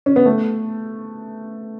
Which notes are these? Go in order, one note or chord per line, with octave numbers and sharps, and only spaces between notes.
C#4
B3
A3